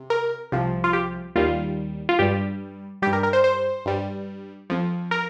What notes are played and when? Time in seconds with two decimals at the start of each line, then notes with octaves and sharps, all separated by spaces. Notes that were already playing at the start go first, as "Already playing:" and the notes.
Already playing: C3
0.10 A#4
0.52 C2 C3 F3
0.84 F4
0.93 G4
1.35 D#2 D#3 G3 F4
2.09 F4
2.19 G2 G3 G4
3.02 G3 G4
3.07 G2
3.13 A#4
3.23 A#4
3.33 C5
3.44 C5
3.85 G2 G3
4.70 F2 F3
5.11 A#4